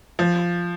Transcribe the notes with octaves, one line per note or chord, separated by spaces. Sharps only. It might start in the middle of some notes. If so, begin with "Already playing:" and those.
F3